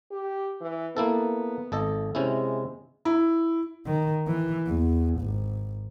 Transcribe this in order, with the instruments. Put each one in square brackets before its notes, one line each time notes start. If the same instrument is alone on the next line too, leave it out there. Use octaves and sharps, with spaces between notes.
[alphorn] G4
E3
[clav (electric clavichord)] A#3 E4 A4 [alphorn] B3
[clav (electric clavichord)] G#1 A4 D#5
[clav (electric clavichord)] C3 C#4 E4 [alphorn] G#3
[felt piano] E4
[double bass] D#3
E3
E2
G#1